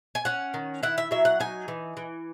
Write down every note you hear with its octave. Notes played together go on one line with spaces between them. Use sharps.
G#5
C#4 F#5
D#3
E4 F#5
E5
F#3 E5
F#5
D#4 G#5
E3
E3